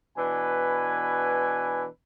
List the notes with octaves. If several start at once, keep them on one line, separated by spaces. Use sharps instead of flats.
B2 E3 D4 B4 G#5